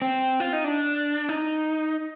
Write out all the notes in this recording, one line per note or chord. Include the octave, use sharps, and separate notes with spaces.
C4
F4
D#4
D4
D#4